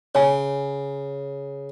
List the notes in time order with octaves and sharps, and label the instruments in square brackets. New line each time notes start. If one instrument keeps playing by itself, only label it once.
[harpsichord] C#3 [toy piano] C#5 G#5